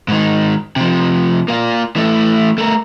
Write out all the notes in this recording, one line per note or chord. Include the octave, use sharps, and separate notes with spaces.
G#2 D#3
C3 F3
A#3 F4
E3 A3
A3 A#4